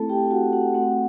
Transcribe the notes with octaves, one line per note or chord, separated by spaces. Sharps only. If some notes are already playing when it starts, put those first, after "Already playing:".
Already playing: A3 C4 E4 A4 A5
G4 G5
F#4 F#5
F#4 F#5
A3 C4 F#4 F#5